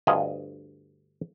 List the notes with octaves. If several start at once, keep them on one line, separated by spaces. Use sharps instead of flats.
D2 G2 F4 D#5 G#5